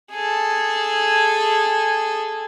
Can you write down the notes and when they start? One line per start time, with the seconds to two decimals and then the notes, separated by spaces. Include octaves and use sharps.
0.11 G#4 A4